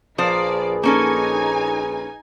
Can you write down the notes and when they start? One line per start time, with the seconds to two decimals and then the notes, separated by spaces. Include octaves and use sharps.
0.18 A#1 F3 A#3 G#4 B4 C5 D5
0.83 A#3 C#4 D#4 A4 G#5